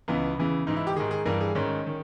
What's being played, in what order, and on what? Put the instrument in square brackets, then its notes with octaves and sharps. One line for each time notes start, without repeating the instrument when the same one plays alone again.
[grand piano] C#2 C#3 E3 B3
E2 C#3 E3
G#2 E3 D#4
E4
G4
G#2 D#3 G#4
G#4
G2 E3 A#4
G#4
G#2 D#3 C#4
D#3